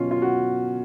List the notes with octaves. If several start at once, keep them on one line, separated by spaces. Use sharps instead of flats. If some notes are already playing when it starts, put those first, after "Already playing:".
Already playing: B2 F#3 C#4 F4
F4
F#4